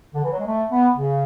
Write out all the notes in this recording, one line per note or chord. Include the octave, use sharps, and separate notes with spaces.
D3
E3
F#3
G#3
A3
B3
C#3